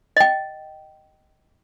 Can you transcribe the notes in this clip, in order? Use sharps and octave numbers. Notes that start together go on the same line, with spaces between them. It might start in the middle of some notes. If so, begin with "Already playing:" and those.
D#5 G5